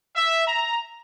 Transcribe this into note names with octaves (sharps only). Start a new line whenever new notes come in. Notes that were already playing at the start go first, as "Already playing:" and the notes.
E5
A#5